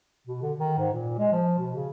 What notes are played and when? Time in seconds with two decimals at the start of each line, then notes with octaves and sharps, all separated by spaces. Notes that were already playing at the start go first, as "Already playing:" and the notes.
0.27 B2
0.42 D3
0.59 D#3
0.78 G#2
0.93 A#2
1.18 G#3
1.32 F3
1.59 B2
1.74 C#3